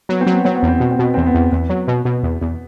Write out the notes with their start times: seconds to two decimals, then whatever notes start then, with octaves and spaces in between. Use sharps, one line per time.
0.09 F#3 B3
0.21 C4
0.27 F#3
0.32 B3
0.44 F#3 C4
0.56 B3
0.63 E2 C4
0.79 B2 B3
0.91 C4
0.99 B2 B3
1.14 E2 C4
1.26 B3
1.34 E2
1.52 E2 B3
1.69 F#3
1.88 B2
2.05 B2
2.23 E2
2.41 E2